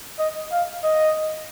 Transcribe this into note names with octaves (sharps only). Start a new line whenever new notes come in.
D#5
F5
D#5